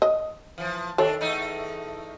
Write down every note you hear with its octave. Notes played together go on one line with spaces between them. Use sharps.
D#5
E3 F3
D#3 D4 A4 C#5
E2 A3 D#4